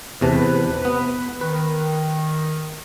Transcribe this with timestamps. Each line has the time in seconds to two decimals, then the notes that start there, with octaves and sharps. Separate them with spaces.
0.21 E2 C3 B4 A5
0.85 B3
1.41 D#3 B4